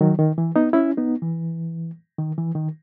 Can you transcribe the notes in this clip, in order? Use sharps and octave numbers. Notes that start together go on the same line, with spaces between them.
D#3 F#3
D#3
E3
B3 D#4
C#4 E4
B3 D#4
E3
D#3
E3
D#3